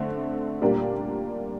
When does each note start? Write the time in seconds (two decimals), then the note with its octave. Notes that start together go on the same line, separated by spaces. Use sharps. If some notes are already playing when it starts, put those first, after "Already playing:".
Already playing: D3 A3 C4
0.62 A#2 G3 A#3 D4 G4